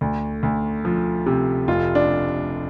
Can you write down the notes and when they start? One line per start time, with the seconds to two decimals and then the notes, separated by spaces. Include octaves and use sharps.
0.01 D2
0.43 D2
0.85 F3
1.26 C3
1.68 F1 F4
1.95 D4